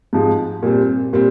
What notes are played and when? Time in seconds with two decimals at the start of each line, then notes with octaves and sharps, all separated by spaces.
0.13 G#2 F3 G#3
0.63 A#2 G3 C4
1.13 A#2 G3 C4